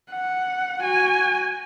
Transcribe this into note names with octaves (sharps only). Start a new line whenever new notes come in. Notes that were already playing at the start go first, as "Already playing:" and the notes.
F#5
F#4 G#5